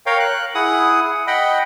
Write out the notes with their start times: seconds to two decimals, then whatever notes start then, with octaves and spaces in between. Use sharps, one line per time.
0.06 A#4 C#5 F5 G5
0.20 F#6
0.55 E4 G#4 F#5 D#6
1.27 D#5 F#5 G5 B5